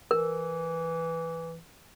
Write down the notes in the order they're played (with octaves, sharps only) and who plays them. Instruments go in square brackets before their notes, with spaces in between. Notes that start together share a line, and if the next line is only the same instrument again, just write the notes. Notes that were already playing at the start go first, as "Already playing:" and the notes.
[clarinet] E3 [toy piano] A#4